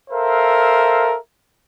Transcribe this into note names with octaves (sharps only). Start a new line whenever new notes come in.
A4 A#4 C5 E5 F5